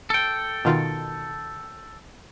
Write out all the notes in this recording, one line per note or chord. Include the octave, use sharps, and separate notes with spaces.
A4 G5
B2 D#3 F4